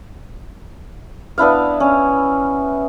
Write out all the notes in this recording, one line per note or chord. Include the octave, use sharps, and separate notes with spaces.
B3 D4 E4 F5
C#4